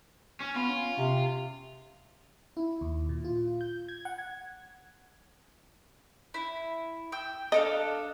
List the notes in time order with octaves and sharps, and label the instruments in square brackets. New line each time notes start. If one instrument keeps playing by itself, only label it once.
[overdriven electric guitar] C#4
[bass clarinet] B3 [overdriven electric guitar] F4
[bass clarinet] C#4
C3
[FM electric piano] E4
D#2
A#2
F4
G6
G#6
F#5
G#6
[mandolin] E4
G5 E6
[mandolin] D4 A4 F5 [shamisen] D#5